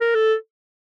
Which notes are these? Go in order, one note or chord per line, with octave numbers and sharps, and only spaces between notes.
A#4
A4